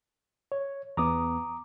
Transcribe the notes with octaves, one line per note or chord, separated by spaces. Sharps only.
C#5
E2 B3 A#5 D6 D#6